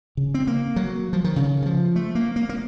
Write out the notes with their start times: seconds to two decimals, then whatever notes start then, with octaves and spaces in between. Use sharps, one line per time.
0.17 C#3
0.34 C4
0.47 A#3
0.76 F#3
1.13 F3
1.24 D#3
1.36 C#3
1.62 D#3
1.66 F3
1.96 A3
2.15 A#3
2.36 A#3
2.49 A#3